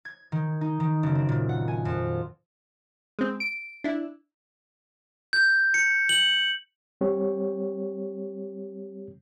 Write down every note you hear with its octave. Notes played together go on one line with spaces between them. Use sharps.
G#6
D#3
D#4
D#3
F#1
C4
A#2
F#5
G#5
F2
G#3 C4
D7
D4 E4
G6
C#7
F#7
G3 C4 G4 C#5